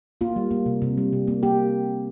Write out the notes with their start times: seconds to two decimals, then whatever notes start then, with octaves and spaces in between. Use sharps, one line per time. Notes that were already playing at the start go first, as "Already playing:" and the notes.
0.21 A#3 F4
0.36 G3
0.51 A#3
0.66 C3
0.82 C3
0.97 G3
1.13 C3
1.27 A#3
1.43 A#3 G4